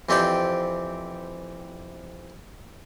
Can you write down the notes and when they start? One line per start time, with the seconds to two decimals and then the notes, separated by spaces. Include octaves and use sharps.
0.09 F2 E3 C4 G4 D5 G5